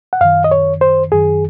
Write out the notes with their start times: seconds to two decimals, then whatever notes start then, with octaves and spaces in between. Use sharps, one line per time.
0.13 F#5
0.21 F#2 D#3 F5
0.44 D#5
0.51 C#5
0.81 C5
1.12 F#2 D#3 G#4